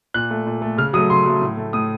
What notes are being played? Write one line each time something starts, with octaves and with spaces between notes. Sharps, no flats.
A#2 F#6
A3
A#2
A3
C#3 F6
F#3 A3 D#6
C#3 C6
F#3 A3
A2
A3
A2 D#6